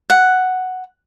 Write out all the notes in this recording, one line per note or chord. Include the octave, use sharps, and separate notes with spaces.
F#5